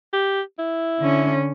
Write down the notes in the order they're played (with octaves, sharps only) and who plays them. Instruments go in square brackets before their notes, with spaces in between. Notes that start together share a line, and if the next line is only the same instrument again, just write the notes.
[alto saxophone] G4
E4
[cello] D3 C#4